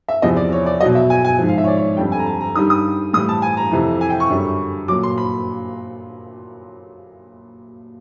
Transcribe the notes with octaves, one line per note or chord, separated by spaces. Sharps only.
E5
E2 C3 F3 D#5
D5
C#5
D5
B2 F#3 D#5
E5
G#5
G#5
G#2 F3
F5
E5
C#5
D5
C#5
F2 D3 G3 G5
G#5
A#5
A5
A#5
G2 D#3 G3 D#6
D#6
A2 E3 G3 D#6
A5
G#5
A#5
F2 C3 E3
G#5
G5
C#6
F#2 D3 G3
A#2 F#3 D6
C6
B5